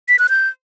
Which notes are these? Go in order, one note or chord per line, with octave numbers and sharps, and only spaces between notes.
B6
F#6
G6